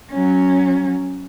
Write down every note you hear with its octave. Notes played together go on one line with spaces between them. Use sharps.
F#3 C#4